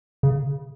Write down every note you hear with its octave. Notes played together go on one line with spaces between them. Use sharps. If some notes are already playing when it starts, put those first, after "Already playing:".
C#3